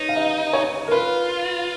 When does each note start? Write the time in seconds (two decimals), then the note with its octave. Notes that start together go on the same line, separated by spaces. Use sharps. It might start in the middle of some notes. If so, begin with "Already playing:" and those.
Already playing: D#4 B4 C#5
0.09 F5
0.16 D#5
0.53 C#5
0.88 A#4
0.91 F4 B4